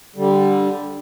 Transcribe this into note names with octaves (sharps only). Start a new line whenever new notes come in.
D3 G3